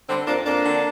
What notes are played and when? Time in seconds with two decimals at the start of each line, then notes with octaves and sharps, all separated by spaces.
0.09 D3 G3 C4
0.27 F2 A#3 D4
0.46 F2 A#3 D4
0.65 D3